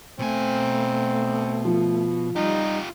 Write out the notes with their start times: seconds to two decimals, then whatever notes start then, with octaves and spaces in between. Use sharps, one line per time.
0.19 B2 A3 C4 G#5
1.65 F3
2.36 G3 D#4 F4 G4